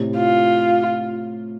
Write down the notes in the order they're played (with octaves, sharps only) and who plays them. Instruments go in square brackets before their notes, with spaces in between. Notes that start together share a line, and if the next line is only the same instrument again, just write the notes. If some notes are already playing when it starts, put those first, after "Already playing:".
Already playing: [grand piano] A2 C3
[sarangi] F4